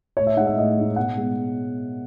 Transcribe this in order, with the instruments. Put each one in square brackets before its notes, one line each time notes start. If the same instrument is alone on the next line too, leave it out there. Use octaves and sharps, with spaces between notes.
[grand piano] A2 C#5
E5
D#4 F#5
G#3
E5
A2 D#5
G#3 D#4
B2 F#5
G#3 B3